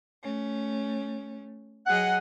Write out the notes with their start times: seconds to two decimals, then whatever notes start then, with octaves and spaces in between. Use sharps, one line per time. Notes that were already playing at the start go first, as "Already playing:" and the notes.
0.24 A3 C#4
1.86 F#3 G#4 D#5 F#5